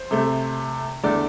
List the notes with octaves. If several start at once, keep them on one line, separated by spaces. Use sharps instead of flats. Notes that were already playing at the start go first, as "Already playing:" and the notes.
Already playing: C5
C3 A3
E2 D3 A3 D5